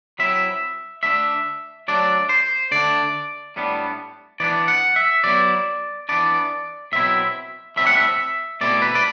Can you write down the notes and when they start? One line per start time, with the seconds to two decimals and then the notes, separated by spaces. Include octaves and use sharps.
0.19 F#3 C4 E4 E5
1.03 D3 A3 D4 E5
1.88 F#3 A3 D4 D5
2.29 C5
2.71 D3 A3 D4 D5
3.56 A2 G3 B3 D4
4.40 E3 B3 D4 D5
4.68 F#5
4.96 E5
5.24 F#3 B3 E4 D5
6.09 E3 B3 D4 D5
6.92 B2 F#3 C4 E4 E5
7.76 A2 G3 C4 E5
7.86 F#5
7.97 E5
8.61 B2 A3 C4 E4 D5
8.82 B4
8.95 D5